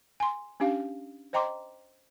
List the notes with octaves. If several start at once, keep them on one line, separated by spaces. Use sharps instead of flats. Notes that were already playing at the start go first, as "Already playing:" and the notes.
G#5 C6
C#4 D4 G4 F5
C5 D#5 G5 A#5 C6 D6